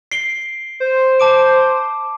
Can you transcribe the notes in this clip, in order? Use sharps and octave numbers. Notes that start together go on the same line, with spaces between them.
C7 D7 G7
C5
A5 D6 D7